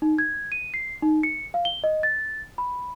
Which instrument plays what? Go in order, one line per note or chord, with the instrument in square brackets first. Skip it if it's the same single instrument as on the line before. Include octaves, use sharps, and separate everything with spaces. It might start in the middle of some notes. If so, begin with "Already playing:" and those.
[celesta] D#4
G#6
D#7
C7
D#4
C#7
F5
G7
D#5
A6
B5